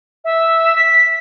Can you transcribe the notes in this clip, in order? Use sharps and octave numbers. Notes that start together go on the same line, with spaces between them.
E5
B6